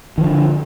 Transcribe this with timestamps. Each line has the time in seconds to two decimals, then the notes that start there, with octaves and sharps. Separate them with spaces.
0.18 D#3
0.21 F3
0.24 D3